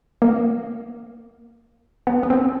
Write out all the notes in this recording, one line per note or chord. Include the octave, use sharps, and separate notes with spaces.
A#3
B3
B3
C4